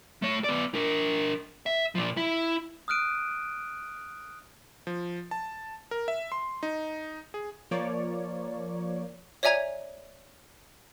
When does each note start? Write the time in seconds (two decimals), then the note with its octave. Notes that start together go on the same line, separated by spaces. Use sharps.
0.22 A3 C#5
0.44 B3 D5
0.74 D4 A#4
1.66 E5
1.95 A#2 F3
2.17 E4
2.88 D#6 F6 F#6 D7 D#7
4.87 F3
5.31 A5
5.91 A#4
6.08 E5
6.32 C6
6.63 D#4
7.34 G#4
7.71 F3 A#3 C#5 D5
9.43 C#5 D5 E5 G#5 A#5 G#6